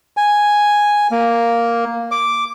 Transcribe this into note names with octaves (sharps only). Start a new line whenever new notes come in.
G#5
A#3
D6